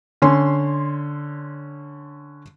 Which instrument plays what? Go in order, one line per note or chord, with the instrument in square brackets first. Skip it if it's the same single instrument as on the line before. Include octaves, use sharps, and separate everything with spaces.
[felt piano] D3 C#4 C6